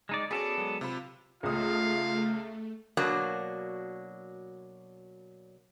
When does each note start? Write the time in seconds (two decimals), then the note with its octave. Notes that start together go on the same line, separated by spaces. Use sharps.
0.09 G#3 D#4 D5
0.31 B3 C#4 F#4 G#4 A4 D5
0.58 F#3 G#3
0.81 C3 F4 B5
1.43 C#2 A3 F4 F5 D#6
2.97 B2 F#3 A#3 D4